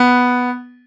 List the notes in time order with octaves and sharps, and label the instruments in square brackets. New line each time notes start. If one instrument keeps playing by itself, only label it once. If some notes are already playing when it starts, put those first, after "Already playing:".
Already playing: [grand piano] B3